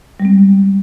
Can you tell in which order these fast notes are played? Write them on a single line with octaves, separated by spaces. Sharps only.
G3 G#3 C4